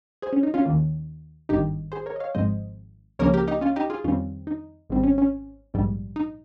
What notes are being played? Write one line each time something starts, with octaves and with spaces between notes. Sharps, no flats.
G#4 C5
C#4
D#4
C#4 F4
D#2 D#3 A#3
G#1 G2 D#3 D#4 G4
G#4 C5
A#4 C#5
D#5
C#5 F5
G#1 G#2 F3 G#3 C4 C5 D#5
C#2 C#3 F3 A#3 C#4 A#4 C#5
G4 A#4
D#4 G4
C#4 F4
D#4 G4
F4 G#4
F2 D#3 G3 C4 C#4 F4
D#4
G#1 G#2 G3 C4
C#4
C#4
A#1 G#2 G3
D#4